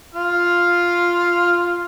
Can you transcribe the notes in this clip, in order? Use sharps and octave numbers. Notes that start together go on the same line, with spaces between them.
F4 F6